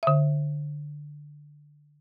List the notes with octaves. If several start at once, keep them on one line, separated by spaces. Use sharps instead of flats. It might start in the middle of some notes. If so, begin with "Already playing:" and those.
D3 E5